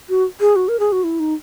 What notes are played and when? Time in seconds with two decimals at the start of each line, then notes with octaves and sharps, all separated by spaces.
0.09 F#4
0.40 G#4
0.56 F#4
0.68 A#4
0.80 G#4
0.92 F#4
1.04 E4
1.20 D#4